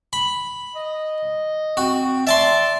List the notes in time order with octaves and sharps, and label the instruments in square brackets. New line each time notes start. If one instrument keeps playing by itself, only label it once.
[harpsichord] B5
[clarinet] D#5
[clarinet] C4 [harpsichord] F#4
[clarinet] D5 [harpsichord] E5 A5 C6